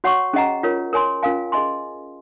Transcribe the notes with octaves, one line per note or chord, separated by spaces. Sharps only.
F#4 C#5 F#5 C#6
C#4 G#4 D#5 F#5 A#5
F4 A#4 C#5
A#4 C#5 G#5 C6
C#4 F4 A#4 F5 G#5
G#4 D#5 G#5 C6